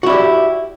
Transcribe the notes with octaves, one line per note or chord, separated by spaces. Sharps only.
E4 F#4 G4 D5